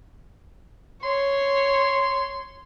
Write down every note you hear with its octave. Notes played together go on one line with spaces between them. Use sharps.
C#5 C6